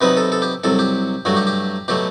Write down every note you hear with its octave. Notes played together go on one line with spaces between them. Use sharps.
C3 F#3 B3 D#4 B4
A4
A4
G4
C2 C3 F#3 A4
G4
G2 F#3 A3 F#4
G4
G4
B2 F#3 A3 G4